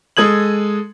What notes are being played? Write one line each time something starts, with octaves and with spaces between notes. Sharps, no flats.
G#3 A4 D#6 G#6 F#7